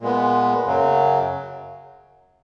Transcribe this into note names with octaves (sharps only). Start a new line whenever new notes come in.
A#2 G#3 B3
F#2 C#3 F#3